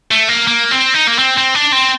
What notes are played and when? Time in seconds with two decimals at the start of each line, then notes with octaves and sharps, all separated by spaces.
0.11 A3
0.29 A#3
0.47 A#3
0.71 C4
0.94 D#4
1.08 A#3
1.19 C4
1.38 C4
1.55 D4
1.72 C4